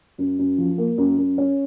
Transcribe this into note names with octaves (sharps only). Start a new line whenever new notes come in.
F#2
F#2
F3
A#3
F#2
F#2
C#4